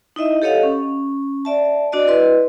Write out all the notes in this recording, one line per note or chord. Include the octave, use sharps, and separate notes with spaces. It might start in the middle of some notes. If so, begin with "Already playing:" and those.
D#4 E4 D#5 E5
G4 A4 C#5 D#5 F5 F#5
C#4
D5 E5 A5
D4 F#4 D5 D#5
E4 B4 D#5 C6